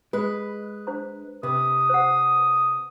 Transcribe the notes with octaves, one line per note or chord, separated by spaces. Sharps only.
G#3 B4
D4 C5 A#5
C3 B4 D#6
C5 F#5